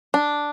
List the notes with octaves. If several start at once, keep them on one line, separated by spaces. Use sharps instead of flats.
D4